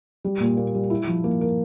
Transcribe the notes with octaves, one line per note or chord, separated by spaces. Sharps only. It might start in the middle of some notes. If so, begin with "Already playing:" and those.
G3
A#2
A#3
G3
E4
F3
A#3
A#4